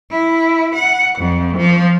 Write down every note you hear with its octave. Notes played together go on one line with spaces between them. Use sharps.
E4
F#5
F2
F3